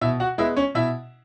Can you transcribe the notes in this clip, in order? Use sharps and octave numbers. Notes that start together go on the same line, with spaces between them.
B2 E4 E5
F#4 F#5
G#3 B3 E4 E5
C#4 C#5
B2 E4 E5